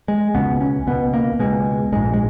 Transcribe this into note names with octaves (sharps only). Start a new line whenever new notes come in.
G#3
C#2 B2 B3
C#4
C#2 B2 B3
A#3
C#2 B2 G#3
A#1 G#2 G#3
G#3